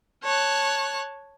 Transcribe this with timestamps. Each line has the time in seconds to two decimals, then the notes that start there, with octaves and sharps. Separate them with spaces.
0.24 C#5 A5 F#6